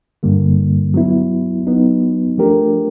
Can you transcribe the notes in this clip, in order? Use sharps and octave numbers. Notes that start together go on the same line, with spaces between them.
G2 D3 G3 A#3
F#3 B3 E4
F#3 B3 D#4
F3 A3 D4 G4 A#4